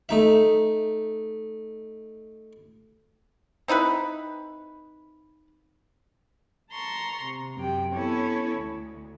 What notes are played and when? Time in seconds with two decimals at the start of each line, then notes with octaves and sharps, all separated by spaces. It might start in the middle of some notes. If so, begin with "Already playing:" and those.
0.09 A3 D#4 E5
3.68 C4 D#4 E4 B4
6.71 A5 A#5 C6 C#6
7.23 C3
7.55 F#2 C3 G5
7.93 B3 C#4 E4 A4 C#5
8.56 D2